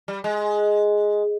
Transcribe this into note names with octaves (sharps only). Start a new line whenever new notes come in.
G3
G#3